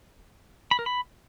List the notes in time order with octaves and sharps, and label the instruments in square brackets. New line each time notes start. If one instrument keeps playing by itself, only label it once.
[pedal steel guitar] B5
A#4
B5